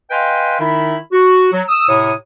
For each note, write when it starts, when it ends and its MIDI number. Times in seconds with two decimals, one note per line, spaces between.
0.11 0.56 71
0.11 0.56 75
0.11 0.56 77
0.11 0.56 79
0.11 0.56 80
0.11 0.56 84
0.60 0.96 51
0.60 0.96 63
0.60 0.96 64
0.60 0.96 76
0.60 0.96 83
1.12 1.51 66
1.53 1.62 54
1.68 1.87 87
1.68 1.87 88
1.88 2.11 45
1.88 2.11 48
1.88 2.11 73
1.88 2.11 87